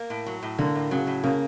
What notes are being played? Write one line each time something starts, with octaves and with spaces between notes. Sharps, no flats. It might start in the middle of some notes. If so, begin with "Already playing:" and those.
Already playing: A#3
A2
F#3
A2
D3 A#3
A2
C#3 F#3
A2
C#3 A#3